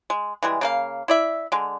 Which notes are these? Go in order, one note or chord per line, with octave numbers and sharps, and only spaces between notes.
G#3
E3 G3 G#3
C#3 A#3 F5
E4 D5 E5
D3 G#3